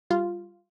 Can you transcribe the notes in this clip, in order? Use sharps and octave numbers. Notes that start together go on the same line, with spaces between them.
G3 F4